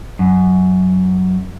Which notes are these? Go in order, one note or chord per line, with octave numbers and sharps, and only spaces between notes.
F#2